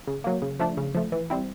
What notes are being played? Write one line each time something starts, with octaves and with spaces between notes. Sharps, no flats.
C#3
F#3 A#3
C#3
F3 A3 D4
C#3
F3 A3
E3
G3 C4 E4